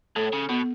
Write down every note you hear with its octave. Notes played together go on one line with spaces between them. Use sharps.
A2 A4
C#3
B2 B3